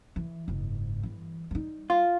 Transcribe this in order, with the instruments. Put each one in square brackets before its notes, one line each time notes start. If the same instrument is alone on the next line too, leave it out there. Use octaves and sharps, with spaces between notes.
[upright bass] E3
F#1 G#2
G1 E3
G3 D#4
[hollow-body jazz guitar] F4